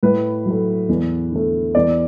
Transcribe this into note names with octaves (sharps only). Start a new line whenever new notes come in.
A2 B4
F#3 A3
E2
D3 A3
E2 D5